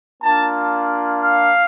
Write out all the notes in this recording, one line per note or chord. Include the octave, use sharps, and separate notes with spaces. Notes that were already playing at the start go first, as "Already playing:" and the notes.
A#3 D4 F4 A5
F5